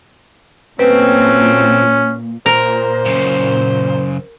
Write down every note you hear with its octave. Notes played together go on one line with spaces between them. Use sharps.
A#2 F#3 A3 C4 C#4 B4
A#2 A#4 C5
F#2 C#3